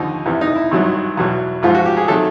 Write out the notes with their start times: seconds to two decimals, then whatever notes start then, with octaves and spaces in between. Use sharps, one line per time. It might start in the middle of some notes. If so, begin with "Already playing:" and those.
Already playing: D#2 D3 F3 D#4
0.26 E2 C3 E3
0.41 D#4
0.56 E4
0.71 G#1 G2 D#3 F#3
1.17 E2 B2 F#3
1.62 A1 G#2 F3 F4
1.75 F#4
1.86 G4
1.97 G#4
2.08 C3 D#3 F#3 A4